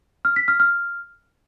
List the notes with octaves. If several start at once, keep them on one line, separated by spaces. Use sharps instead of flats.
F6
B6
F6
F6